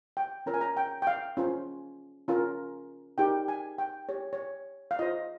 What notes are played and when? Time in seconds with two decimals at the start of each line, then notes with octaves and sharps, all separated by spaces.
0.17 G5
0.46 C#4 F4 A#4 C#5 A#5
0.54 G#5
0.61 A#5
0.77 G5
1.02 G5
1.07 F5
1.37 C#4 F4 C5
2.28 C#4 F4 A#4
3.18 D#4 G4 A#4 G5
3.48 G#5
3.78 G5
4.09 G4 C#5
4.33 C#5
4.91 F5
4.99 F4 C5 D#5